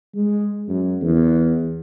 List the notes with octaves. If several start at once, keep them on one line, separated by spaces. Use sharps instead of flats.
G#3
F#2
E2